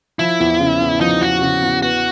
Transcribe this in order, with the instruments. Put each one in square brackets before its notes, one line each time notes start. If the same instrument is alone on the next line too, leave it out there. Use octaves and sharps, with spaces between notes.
[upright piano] F3 [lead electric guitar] E4
[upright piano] E2
C#3
E2
[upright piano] F3 [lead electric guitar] D#4
[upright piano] E2 [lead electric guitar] F#4
[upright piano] C#3
E2
[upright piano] B3 [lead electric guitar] F#4